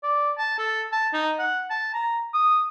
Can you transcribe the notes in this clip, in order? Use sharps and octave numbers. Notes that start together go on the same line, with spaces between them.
D5
A5
A4
A5
D#4
F#5
A5
A#5
D#6